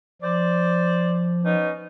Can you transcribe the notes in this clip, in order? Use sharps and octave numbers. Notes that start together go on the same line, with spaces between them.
F3 C5 D5
B3 C#4 D#4